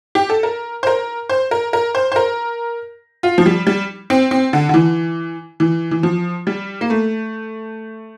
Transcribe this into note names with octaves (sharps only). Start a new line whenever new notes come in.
G4
A4
A#4
C5
A#4
C5
A#4
A#4
C5
C5
A#4
F4
F3
G3
G3
C4
C4
D3
D3
E3
E3
E3
F3
G3
A#3
A3